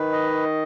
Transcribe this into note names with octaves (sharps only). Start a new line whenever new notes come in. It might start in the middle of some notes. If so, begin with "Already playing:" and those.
Already playing: D#3 B4
D#5